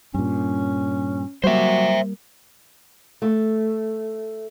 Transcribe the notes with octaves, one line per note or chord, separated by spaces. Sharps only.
G2 A#2 C#4
F#3 G3 A#3 C5 E5
A3